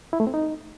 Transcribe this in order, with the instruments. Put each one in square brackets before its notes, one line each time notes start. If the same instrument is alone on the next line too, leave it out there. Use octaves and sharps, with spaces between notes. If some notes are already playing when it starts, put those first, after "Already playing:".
[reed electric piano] E4
A3
C4
D#4